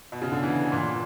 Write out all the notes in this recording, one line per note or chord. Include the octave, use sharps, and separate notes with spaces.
B2
C#3
D3
E3
A#2